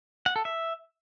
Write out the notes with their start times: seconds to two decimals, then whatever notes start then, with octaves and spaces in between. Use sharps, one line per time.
0.26 F#5
0.36 A4
0.45 E5